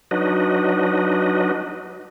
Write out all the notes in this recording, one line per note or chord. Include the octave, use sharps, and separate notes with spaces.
F#3 D4 D#4 F#4 B4 D#5